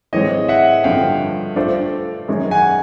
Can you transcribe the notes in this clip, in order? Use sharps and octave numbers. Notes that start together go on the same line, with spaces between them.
A2 E3 G#3 C4 C#5 D#5
E5 F#5
G2 D3 F3 F5 G5
A3 D4 F4 A4 C5
F#2 D#3 G#3 C#4
F#5 G#5